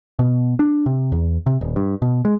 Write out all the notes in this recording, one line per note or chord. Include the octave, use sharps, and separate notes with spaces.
B2
D4
C3
E2
C3
D#1
G2
B2
G#3